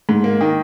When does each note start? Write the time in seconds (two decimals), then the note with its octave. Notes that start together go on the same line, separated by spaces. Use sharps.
0.09 G#2
0.24 A#3
0.41 D#3